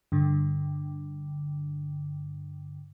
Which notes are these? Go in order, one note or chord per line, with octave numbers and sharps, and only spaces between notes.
G2 D3